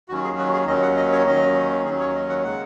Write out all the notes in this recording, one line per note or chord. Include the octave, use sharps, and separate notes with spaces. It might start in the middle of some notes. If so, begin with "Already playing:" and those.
D#2 D#3 F#3 C#4 F#4
G#4
F#4
G#4
D#2 D#3 F#3 C#4 D#5
F#5
D#5
C#5
D#2 D#3 F#3 C#4 D#5
D#2 D#3 F#3 C#4 G#4
C#5
D#5
F#5
C#3 G#3 F#5